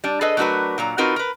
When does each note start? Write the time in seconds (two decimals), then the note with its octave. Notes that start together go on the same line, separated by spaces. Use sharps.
0.04 G3 D4
0.21 G#4 A4 B4 D#5
0.37 F#3 A3 D4 F#4 A#4 B4
0.78 A#2 F#3 A#5
0.98 C4 D#4 F4 F#4 A#4 B4
1.16 A#4 B4